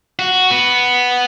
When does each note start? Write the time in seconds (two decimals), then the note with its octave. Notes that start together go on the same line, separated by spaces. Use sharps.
0.19 F#4
0.51 B3